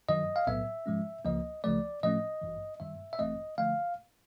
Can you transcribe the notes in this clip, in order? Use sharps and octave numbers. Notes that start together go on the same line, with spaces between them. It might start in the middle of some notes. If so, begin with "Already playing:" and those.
G2 D#3 F#3 D#5
F5
B1 A2 F#3 B3 E5
G#2 F3 G#3 C#4
C#2 C#3 F3 A#3 D#5
C#2 C#3 F3 A3 D5
A2 F3 A3 C#4 D#5
G#1 G2 E3
G2 D#3 G3 E5
E5
A1 G2 E3 A3 C4 D#5
D3 F3 A3 F5